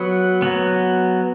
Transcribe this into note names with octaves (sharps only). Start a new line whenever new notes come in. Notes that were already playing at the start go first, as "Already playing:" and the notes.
Already playing: F#3 B3 F#5
F#3 B3